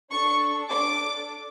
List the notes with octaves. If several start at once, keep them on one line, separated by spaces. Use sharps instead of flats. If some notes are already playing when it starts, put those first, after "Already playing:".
D4 A4 C#6
D4 A4 D6